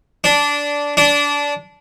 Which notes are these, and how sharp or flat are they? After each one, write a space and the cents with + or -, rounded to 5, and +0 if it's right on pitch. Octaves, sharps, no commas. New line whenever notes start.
D4 -15
D4 -20